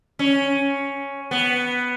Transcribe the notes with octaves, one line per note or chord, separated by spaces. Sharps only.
C#4
B3